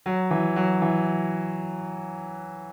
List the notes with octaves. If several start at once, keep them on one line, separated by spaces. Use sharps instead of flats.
F#3
E3
F#3
E3